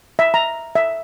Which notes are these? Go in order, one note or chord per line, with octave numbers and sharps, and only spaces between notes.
E5
A#5
E5